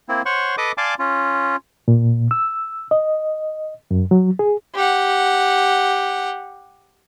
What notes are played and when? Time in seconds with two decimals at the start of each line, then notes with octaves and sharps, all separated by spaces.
0.09 A#3 C4 E4
0.26 C5 C#5 F#5 C6 C#6
0.58 A4 B4 D#5 D6 D#6
0.78 D5 F5 G#5 A5 C6 D6
0.99 C#4 F4
1.88 A#2
2.31 E6
2.91 D#5
3.91 F#2
4.11 F#3
4.39 G#4
4.75 G4 F#5